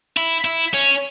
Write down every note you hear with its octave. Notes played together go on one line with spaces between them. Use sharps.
E4
E4
C#4